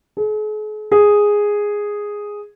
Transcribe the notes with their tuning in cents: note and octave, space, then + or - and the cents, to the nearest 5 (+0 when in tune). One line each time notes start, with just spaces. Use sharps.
G#4 +45
G#4 -5